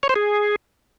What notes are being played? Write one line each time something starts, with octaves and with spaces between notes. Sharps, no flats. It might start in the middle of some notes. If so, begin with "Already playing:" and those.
C#5
C5
G#4